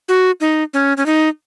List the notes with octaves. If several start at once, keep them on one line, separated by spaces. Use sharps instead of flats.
F#4
D#4
C#4
C#4
D#4